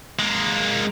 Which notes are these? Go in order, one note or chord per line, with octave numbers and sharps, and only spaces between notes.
G#3 A#3